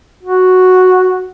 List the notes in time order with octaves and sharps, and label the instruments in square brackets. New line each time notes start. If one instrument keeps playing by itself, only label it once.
[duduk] F#4